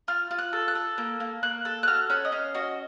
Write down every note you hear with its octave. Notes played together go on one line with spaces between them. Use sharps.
F4 F6
F4
F#6
A4
F#6
A4
A#3
A#3
A#3 F#6
A4
F#6
F#4 F6
C#4 F#5
D#5
C#4 F5
F#4 D#5